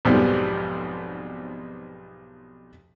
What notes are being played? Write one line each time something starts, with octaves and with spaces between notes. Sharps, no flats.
B1 F2 G#2 B2 F3 G3